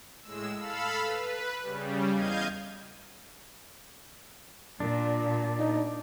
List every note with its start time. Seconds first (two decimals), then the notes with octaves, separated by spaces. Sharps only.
0.22 A2 G#3 E6
0.57 A4 F5 B5 E6
1.03 B4
1.62 C#3 G3
2.12 E2 D#5 F5 G6 G#6 D#7
4.80 A#2 D4
5.59 D#4